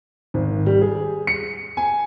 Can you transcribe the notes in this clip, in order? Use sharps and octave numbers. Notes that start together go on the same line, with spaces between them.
G#1
G3
G#4
C#7
G#5